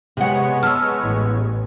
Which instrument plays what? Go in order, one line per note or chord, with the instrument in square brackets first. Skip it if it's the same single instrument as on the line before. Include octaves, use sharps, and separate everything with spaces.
[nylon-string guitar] C3 F#5 [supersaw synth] G#3 B3 C#5
[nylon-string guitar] A5 [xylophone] E6 F6
[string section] A1